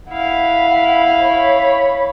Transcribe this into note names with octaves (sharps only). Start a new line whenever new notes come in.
E4 F5 F#5 B5
C#5 B5